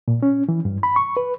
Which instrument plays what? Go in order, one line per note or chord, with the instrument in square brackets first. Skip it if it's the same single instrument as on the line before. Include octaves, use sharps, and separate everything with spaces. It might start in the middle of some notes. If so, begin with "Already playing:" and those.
[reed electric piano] A#2
C#4
E3
G2
B5
C#6
B4